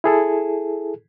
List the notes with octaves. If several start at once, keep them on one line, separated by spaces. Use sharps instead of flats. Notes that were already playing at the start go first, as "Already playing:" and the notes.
E4 G#4 A4